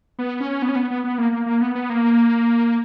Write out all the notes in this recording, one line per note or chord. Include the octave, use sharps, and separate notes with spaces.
B3
C#4
B3
C#4
B3
B3
B3
A#3
A#3
A#3
B3
B3
A#3